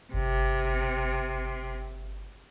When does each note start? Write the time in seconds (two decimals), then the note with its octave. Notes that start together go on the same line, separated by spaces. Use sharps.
0.14 G1 C3